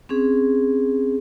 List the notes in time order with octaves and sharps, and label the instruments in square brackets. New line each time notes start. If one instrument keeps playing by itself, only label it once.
[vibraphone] C4 C#4 G#4